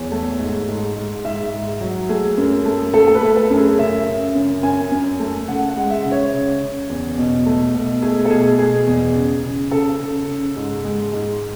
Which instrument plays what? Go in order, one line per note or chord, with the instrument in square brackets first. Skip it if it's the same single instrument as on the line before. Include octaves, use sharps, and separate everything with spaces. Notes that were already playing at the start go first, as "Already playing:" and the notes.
Already playing: [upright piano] E2 C#5
A3
G#2
G#2
G#2
G#2 E5
G#2
F#3
A3 G#4
F#2
A3
A3 A4
A4
B4
A3
A4
F#2
G#4
C#3 E5
C#3
F#2
F#2 G#5
F#2
A3
C#3 F#5
F#5
G#3
E5
C#3
C#5
C#3
C#3
E2
B2
A3
B2
A3 G#4
A4
B2 G#4
B2 G#4
E2
C#3
C#3
C#3 A4
C#3
C#3
G#2
G#3
G#2